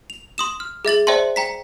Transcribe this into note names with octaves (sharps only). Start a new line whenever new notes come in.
F7
C6 D#6 E7
F6
G#4 E5 A6 F#7
C5 D5 E5 G5 A5 C6
G5 A#5 B6